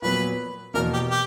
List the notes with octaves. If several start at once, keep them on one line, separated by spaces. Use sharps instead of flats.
A#2 F#3 B3 B4
E2 B2 A#3 A#4
G4
G4